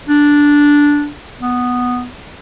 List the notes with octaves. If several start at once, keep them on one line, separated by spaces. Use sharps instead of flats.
D4
B3